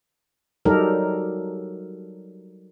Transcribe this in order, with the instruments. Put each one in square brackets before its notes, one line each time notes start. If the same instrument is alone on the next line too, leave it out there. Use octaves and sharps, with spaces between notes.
[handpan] F#3 G3 D#4 G4 A4 A#4